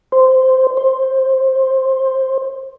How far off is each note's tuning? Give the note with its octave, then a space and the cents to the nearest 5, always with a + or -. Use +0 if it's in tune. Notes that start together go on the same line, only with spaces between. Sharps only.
C5 -10
C5 +15